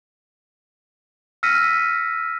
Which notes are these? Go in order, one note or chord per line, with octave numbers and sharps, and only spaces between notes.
E6 F6 A#6 B6 C#7 D#7